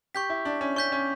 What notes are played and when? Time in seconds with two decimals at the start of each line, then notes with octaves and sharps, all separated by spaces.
0.15 G4 C#6 G6 B6
0.30 E4
0.45 D4
0.61 C#4
0.76 C#4 C#6 G6 B6
0.92 C#4